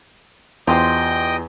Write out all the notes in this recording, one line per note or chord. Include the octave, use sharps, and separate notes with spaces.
E2 F4 G4 C5 D#5 G5